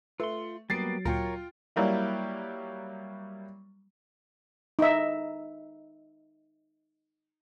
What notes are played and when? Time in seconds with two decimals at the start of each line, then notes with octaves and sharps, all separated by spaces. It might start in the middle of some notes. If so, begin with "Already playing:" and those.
0.20 A3 F4 B4 C6 E6 F#6
0.70 F#3 G3 A#3 B3 A6 C7 D7
1.05 D2 A#2 F4 A#4 C#5 G5
1.76 F#3 G3 A#3 E4
4.79 D#4 E5